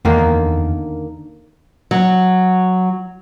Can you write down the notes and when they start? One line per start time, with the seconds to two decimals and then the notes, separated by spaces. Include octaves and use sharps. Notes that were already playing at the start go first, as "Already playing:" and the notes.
0.05 E2 D3 D#3 A#3
1.91 F#3